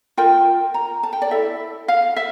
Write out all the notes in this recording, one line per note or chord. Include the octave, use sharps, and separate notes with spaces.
F4 A#4 G5
A#5
A5
G5
D5
E4 A4 E5
F5
E5